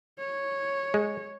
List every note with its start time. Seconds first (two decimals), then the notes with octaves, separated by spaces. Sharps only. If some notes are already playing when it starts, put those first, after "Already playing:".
0.19 C#5
0.94 G#3